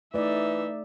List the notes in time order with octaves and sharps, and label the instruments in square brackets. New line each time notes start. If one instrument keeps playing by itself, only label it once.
[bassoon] E3 [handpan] A3 D5 [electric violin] D#4 E5